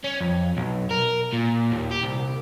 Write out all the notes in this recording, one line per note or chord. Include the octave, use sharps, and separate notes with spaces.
C#4
F2
B1
A#4
A#2
D#2
G4
C2